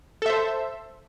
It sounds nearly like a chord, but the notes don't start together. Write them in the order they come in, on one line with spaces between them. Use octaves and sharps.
A4 E5 C5